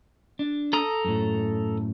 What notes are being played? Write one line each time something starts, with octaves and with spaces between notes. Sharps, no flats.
D4
A4 A#5 D#6
F#2 A2